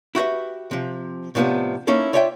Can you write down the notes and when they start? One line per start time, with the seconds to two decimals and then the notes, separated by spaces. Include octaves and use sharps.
0.15 E4 F#4 G4 B4 E5
0.71 C3 F3
1.35 A2 C3 F3 A#3 B3 D4
1.87 A#3 C#4 D#4 E4 A4
2.13 F4 C#5 D5 E5 F#5 G5